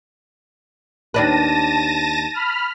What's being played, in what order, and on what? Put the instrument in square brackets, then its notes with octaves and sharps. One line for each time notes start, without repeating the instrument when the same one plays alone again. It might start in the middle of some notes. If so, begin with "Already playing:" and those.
[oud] D#2 D4 B4 [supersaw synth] A5 A#6 D#7
[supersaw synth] B5 F6